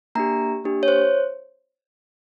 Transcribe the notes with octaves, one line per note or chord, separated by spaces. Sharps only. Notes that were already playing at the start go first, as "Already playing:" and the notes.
A#3 D4 G4 A#5
A#3 D4 G4
C#5
C5